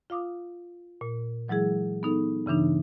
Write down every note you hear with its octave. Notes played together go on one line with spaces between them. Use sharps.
F4 F5 D6 D#6
A#2
E3 F#3 G#3 E4 G#4
B3 D#4 A4
G2 C#3 E3 D4 D#4